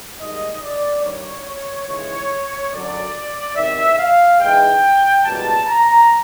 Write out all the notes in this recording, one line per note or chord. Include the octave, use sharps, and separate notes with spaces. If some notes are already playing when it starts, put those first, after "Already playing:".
G#2 D#3 G3 A#3 D#5
D5
G2 D#3 G3 A#3 C#5
C#5
D#2 C#3 E3 G#3 C#5
F#2 D3 F#3 D5
E2 C3 D#3 E5
F5
G#2 E3 G#3 G5
C#2 B2 G3 A#3 A5
A#5